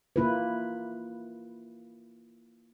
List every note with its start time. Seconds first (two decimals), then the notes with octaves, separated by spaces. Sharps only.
0.16 A#3 E4 F4 B4